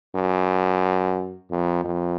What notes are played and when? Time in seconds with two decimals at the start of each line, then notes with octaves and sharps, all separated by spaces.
0.15 F#2
1.51 F2
1.85 F2